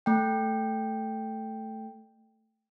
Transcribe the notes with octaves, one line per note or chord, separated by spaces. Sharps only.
A3 G5